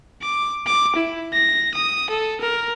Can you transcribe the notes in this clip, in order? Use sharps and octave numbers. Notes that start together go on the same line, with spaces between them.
D6
D6
E4
A#6
D#6
A4
A#4